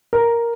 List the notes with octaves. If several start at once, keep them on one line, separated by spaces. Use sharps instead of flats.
A#4